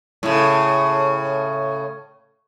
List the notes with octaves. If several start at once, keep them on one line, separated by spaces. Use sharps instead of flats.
A2 C#3